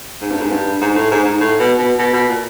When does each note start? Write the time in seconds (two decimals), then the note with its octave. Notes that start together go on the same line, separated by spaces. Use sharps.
0.22 G#2
0.31 G2
0.41 G#2
0.51 G2
0.81 G#2
0.95 A2
1.11 G#2
1.25 G#2
1.40 A2
1.59 B2
1.79 B2
1.99 B2
2.13 B2
2.28 A#2